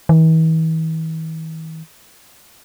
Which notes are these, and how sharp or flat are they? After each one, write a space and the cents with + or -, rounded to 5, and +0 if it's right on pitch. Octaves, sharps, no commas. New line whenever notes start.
E3 -45